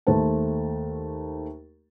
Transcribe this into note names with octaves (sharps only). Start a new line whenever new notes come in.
D#2 A3 C5 A5